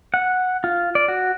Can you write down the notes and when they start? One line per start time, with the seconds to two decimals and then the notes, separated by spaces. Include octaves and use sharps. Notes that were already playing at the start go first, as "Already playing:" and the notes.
0.14 F#5
0.64 F4
0.95 D5
1.08 F#4